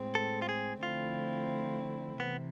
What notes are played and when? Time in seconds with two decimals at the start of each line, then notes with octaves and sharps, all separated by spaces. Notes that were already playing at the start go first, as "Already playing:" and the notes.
Already playing: A2 G#3 C4
0.15 A4
0.42 F4
0.49 G#4
0.83 D3 F3 A3 C4 E4 F4
2.20 C3 E3 B3